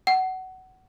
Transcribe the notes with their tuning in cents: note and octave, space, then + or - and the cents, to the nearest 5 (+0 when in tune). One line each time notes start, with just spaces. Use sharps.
F#5 +20